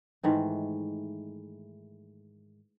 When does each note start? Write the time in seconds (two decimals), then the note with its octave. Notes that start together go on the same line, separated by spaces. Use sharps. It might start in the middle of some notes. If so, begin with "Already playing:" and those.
0.23 G#2 D#3 E3 A3